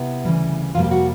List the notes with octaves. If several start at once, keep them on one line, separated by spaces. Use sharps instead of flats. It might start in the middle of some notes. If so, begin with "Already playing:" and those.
Already playing: C3 B3 E4
D2 C#3 E3 G3
F2 C3 D#3 G3 A#3 F4
G4
F#4